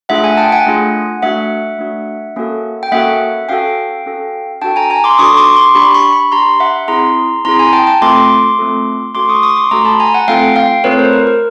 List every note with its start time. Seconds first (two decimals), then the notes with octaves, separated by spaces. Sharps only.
0.09 A3 D4 F4 G#4 E5 F#5
0.24 F#5 G#5
0.37 G5 A5
0.52 F#5 G#5
0.66 A3 D4 F4 G#4
1.22 A3 D4 F#4 E5 F#5
1.79 A3 D4 F#4
2.36 A#3 C#4 F#4 A4
2.83 G5
2.92 A#3 C#4 F#4 A4 E5 F#5
3.49 C#4 F#4 A4 F5 G5
4.06 C#4 F#4 A4
4.61 D4 F#4 A4 G5 A5
4.76 G#5 A#5
4.90 G#5 A#5
5.04 C6 D6
5.18 D4 F#4 A4 C#6 D#6
5.37 C6 D6
5.56 C6 D6
5.75 D4 G4 B5 C#6
5.94 B5 C#6
6.12 B5 C#6
6.32 D4 G4 A#5 C6
6.60 E5 F#5
6.88 C4 E4 G#4 A#5 C6
7.45 C4 E4 G#4 A#5 C6
7.59 G#5 A#5
7.73 G5 A5
7.87 G5 A5
8.01 A3 C4 F4 A4 C6 D6
8.59 A3 C4 F4 A4
9.15 A3 C#4 F#4 A4 C6 D6
9.29 C#6 D#6
9.43 C#6 D#6
9.57 C6 D6
9.71 A3 C#4 F#4 A4 A#5 C6
9.85 A5 B5
10.00 G#5 A#5
10.14 F#5 G#5
10.28 A3 C4 F4 A4 F5 G5
10.56 F5 G5
10.84 A3 C4 F4 A4 B4 C#5
10.98 A#4 C5
11.13 A#4
11.27 A#4